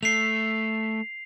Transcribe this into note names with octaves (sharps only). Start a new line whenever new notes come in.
A3 C7 F7